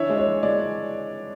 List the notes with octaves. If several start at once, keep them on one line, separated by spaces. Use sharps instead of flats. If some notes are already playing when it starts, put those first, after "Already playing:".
Already playing: E3 D4 C#5 E5
G#3
C#5
E3
G#3 D5